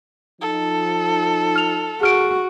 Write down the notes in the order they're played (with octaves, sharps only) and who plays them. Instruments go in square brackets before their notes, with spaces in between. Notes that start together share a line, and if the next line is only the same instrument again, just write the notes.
[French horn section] F3 D#4 [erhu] A4
[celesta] F6 F7
[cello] F#4 [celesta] G#4 F6 D7